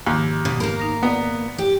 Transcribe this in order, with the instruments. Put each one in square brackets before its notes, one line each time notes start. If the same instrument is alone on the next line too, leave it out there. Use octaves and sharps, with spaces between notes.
[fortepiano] D#2 [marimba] G#2 D#3 F3
[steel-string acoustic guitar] B2
[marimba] G#2 [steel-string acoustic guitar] A#3 A#4
[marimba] D#4 A#6
[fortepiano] B3 [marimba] B4 D5 D#5
[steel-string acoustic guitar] G4